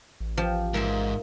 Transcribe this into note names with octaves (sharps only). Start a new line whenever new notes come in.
A1
F3 G4
G#2 A#3 E5 G#5